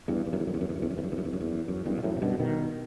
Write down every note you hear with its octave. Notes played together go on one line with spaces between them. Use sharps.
E2 G2
E2
F#2
E2
F#2
E2
F#2
E2
F#2
E2
F#2
E2
F#2
E2
F#2
E2
F#2
E2
F#2
E2 G2
B2
F#2 A2
C3
G2 B2
B2 D#3